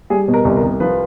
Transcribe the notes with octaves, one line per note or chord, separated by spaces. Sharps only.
G3 G#4
B2
A#4
C2
A#4
C2
F3 B4